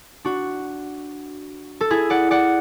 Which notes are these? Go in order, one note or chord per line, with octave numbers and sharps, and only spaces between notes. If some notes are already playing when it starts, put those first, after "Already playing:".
D4 F#4
A4
E4 G#4
D5 F#5
D5 F#5